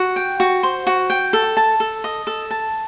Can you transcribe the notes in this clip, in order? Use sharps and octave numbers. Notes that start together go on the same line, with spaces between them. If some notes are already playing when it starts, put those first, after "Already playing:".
Already playing: F#4
G5
F#4
C5
F#4
G5
A4
A5
A4
D#5
A4
A5